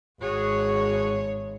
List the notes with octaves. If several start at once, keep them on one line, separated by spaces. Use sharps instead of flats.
G#1 F#4 G#4 C#5